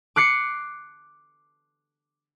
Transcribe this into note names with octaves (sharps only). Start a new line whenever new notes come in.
D6 F#6 C7 C#7